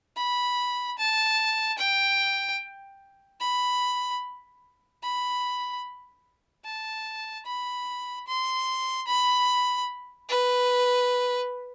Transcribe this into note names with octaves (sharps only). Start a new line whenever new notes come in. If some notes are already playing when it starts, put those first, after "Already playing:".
B5
A5
G5
B5
B5
A5
B5
C6
B5
B4